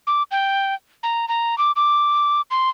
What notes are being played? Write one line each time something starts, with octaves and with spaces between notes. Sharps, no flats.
D6
G5
A#5
A#5
D6
D6
C6